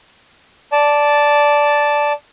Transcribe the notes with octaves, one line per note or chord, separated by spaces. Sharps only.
D5 A5